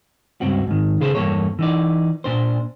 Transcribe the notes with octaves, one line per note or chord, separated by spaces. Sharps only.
C#2 G2 C4 F#4
G#2 D#3
C#3 G#4 A4 C5
E2 G2 A#2 A#3 A4 C#5
E3 D#4 D5
A#2 D4 C5